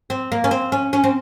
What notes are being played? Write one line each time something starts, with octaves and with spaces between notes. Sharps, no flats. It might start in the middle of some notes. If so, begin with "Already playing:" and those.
C4
A#3
C#4
C4
C#4
C#4
C4